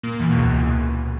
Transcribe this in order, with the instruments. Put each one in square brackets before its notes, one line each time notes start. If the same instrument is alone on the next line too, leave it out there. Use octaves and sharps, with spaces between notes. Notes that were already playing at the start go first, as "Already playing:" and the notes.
[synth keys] A#2 A#3
E2 E3
B2
C#2 C#3
E2 E3